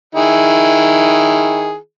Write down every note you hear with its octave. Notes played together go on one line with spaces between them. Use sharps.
D#3 E4 G#4